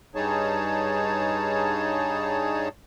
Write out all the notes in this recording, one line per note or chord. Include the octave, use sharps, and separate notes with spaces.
G2 G3 D#4 G#4 C#5 A5